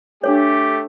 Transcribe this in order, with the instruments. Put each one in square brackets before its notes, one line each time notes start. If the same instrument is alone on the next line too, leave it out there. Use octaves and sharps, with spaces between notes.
[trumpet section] A3 G4 [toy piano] D4 A4 C#5